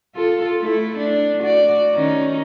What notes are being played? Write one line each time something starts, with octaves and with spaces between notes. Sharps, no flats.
F4 A4
A3 E4 A4
D4
F#4 D5
D#3 C#4 D#4